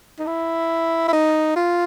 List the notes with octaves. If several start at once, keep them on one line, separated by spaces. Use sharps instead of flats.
D#4
E4
E4
D#4
F4